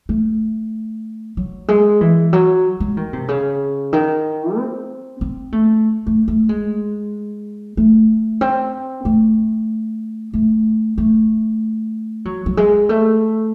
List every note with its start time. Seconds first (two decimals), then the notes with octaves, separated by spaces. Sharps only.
0.09 A3
1.37 F#3
1.68 G#3
2.01 E3
2.33 F#3
2.80 G#3
2.97 D#3
3.13 C3
3.28 C#3
3.93 D#3
4.57 C4
5.21 C4
5.52 A3
6.07 A3
6.28 A3
6.49 G#3
7.77 A3
8.41 C4
9.05 A3
10.34 A3
10.98 A3
12.25 F#3
12.46 F#3
12.57 G#3
12.89 A3